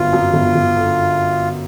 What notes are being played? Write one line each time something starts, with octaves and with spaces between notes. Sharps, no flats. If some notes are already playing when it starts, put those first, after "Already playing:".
Already playing: G1 F#2 F4
F#2
G1
G1
D3